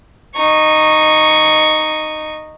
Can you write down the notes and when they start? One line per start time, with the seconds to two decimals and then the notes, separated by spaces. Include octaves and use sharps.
0.36 D#4 C#6